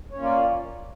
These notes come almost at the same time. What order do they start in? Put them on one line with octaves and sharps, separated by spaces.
C#5 C#4 A#3 F4 D5